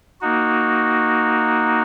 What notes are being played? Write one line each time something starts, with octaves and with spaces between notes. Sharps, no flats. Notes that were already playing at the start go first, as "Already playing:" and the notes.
A#3 D#4 F#4